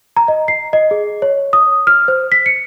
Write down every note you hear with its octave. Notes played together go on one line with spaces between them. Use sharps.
A#5
D#5
C7
D#5
G#4
C#5
D#6
F6
C5
B6
C#7